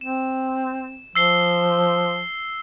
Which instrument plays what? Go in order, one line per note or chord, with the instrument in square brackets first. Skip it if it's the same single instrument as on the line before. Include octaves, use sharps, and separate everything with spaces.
[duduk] C4 [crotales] E7
[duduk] F3 [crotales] E6 C7 G7